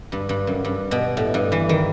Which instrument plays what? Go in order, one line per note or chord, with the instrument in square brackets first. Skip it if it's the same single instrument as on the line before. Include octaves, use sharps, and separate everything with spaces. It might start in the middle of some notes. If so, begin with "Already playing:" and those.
[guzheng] G2
G2
F#2
G2
B2
A2
G2
E3
D#3